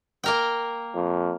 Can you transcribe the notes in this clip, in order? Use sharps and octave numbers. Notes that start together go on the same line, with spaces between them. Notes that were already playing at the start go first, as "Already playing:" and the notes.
A#3 A#4 G5
F2